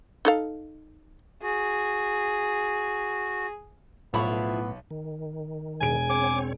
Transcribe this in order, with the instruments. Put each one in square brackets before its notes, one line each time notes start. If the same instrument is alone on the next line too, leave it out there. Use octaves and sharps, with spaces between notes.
[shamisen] D#4 A4 F5
[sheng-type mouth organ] F#4 [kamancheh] G#4
[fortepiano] B1 B5 C#6 [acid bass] A2 [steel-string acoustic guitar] F3 E4 F5 [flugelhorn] B3
[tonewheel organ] D#3
[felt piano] E1 G#4 D7 [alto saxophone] G#5
[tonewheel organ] C4 C#5 [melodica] D6